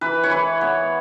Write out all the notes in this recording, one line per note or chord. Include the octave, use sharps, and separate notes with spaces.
E3 B4
C#5
E3 B4
B3 C#5